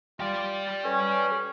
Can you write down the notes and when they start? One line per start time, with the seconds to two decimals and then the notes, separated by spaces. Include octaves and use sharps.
0.20 F4 G4 D5 A6
0.85 C#4 A4 B4 G#5